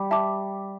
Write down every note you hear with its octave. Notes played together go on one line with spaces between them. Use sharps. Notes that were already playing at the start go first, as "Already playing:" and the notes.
Already playing: G3 G4
E5 A5 D6